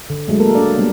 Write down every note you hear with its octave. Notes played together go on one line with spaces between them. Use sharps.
D3
F#3 G#3 A3
A#3 A4 A#4
D4 D5
G3 A#3 B3 D4